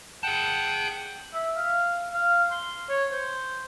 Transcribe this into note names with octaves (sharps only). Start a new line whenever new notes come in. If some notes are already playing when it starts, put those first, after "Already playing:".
G#4 F#5 G5 A5
E5
F5
F5
C6
C#5
C5